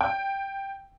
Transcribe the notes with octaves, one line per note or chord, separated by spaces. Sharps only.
G5